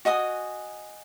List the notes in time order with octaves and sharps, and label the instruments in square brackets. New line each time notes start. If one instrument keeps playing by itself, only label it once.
[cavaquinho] F#4 D#5 G#5 D#6